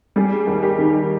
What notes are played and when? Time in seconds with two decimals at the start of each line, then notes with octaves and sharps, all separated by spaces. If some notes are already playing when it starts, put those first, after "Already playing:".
0.16 G3 G#4
0.47 D#2
0.63 G4
0.78 D#3